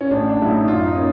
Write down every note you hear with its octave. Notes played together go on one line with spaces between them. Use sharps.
C#4
A1 D4
D4
A2 F#3 E4
D#4
F#2 F4
D#4
A#3 C#4